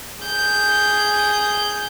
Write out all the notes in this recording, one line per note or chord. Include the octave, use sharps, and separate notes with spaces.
G#4 G6